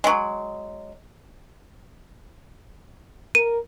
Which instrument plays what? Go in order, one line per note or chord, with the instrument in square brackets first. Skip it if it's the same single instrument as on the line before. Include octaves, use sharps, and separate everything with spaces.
[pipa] F#3 G#3
[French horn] A#4 [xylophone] D#7